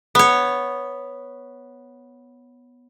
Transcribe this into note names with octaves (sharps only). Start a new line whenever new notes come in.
B3 C#5